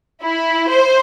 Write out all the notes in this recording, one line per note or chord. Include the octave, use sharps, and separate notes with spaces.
E4
C5